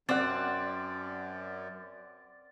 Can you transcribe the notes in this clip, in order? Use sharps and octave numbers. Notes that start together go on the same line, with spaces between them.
F#2 C4 D5 F#5